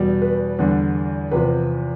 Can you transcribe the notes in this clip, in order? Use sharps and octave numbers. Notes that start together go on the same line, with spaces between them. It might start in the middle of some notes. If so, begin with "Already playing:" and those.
Already playing: E2 B2 G3
B4
E2 D3 G3
E2 C3 F3 B4